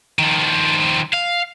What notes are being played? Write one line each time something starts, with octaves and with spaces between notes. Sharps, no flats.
D#3 F3
F5